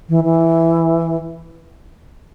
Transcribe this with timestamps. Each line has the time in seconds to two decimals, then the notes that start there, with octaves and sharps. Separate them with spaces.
0.09 E3
0.23 E3